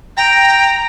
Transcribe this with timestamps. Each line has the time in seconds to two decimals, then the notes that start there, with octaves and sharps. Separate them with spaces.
0.17 G5 A#5